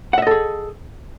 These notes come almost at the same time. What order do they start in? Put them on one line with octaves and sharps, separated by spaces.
F#5 E5 D#5 A4 G#4